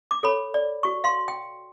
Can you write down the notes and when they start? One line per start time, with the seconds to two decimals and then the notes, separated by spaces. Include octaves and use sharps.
0.11 D6
0.23 A4 C#5 B5
0.54 D5
0.83 F#4 C#6
1.04 F5 C6
1.28 G5